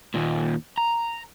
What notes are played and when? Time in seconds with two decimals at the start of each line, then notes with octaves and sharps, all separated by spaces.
0.14 D#2 A#2
0.78 A#5